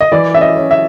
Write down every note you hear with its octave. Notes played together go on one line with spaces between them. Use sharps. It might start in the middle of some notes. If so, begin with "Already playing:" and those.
D#5
E3 D5
C#4 E5
D#5
C#4
E5